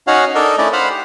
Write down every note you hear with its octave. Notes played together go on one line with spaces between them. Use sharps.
C#4 D#4 F#4 C#5 F5 F#5
D4 D#4 A4 A#4 D#5
A3 C#4 E4 D5 D#5
C5 F5 F#5 B5
G4